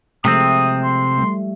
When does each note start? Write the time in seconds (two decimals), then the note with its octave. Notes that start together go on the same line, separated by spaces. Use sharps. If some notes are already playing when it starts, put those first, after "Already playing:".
0.25 C3 F3 G#3 A3 C4 D#6
0.83 C6
1.18 G3 A3